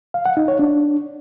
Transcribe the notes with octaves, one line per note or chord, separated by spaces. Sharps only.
F5
F#5
D#4
C#5
D4